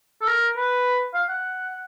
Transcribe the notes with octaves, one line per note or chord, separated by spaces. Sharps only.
A4
A#4
B4
F5
F#5